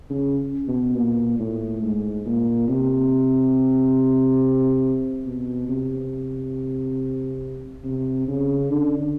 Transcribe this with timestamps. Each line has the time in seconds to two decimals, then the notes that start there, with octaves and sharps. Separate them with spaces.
0.10 C#3
0.68 B2
0.97 A#2
1.39 A2
1.82 G#2
2.26 A#2
2.69 C3
5.26 B2
5.69 C3
7.84 C3
8.28 C#3
8.70 D3